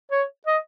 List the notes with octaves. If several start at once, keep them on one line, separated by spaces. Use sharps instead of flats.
C#5
D#5